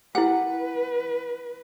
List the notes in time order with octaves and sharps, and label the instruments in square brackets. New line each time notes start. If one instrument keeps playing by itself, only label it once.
[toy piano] E4 G#5 [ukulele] G4 A#4 F#5 [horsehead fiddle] B4